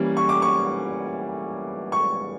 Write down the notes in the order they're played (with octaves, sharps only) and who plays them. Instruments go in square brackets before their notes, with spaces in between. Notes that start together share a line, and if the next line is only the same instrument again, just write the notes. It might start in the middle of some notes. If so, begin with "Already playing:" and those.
Already playing: [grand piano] E3 G3 A#3 C#4
C#6
D6
C#6
C#6